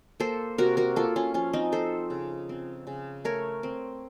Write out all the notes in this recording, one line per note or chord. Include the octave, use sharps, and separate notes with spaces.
A#3 A4 C5
C3 F#4 A#4
F#4 A#4
A#3 F4 A4
C#4 F4
F3 C#4 F4
C4 D#4
F3 A4 C5
C#3
C4
C#3
A3 A#4 C#5
C4